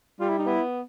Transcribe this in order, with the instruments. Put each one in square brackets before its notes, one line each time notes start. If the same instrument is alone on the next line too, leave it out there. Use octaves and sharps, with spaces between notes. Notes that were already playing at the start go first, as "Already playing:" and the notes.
[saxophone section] G3 [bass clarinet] F4
[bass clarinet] E4
D#4
[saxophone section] B3 [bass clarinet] E4